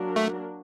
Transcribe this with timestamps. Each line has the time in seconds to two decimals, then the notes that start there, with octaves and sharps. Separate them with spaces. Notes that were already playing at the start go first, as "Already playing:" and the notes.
Already playing: F#3 A#3 D4 F#4 A#4
0.16 A3